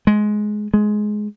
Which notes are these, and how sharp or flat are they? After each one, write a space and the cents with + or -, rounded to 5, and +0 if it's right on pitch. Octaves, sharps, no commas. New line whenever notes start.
G#3 +15
G#3 +15